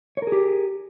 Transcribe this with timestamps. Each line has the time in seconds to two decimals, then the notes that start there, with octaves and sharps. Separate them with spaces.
0.17 C#5
0.22 A#4
0.27 G#4
0.32 G4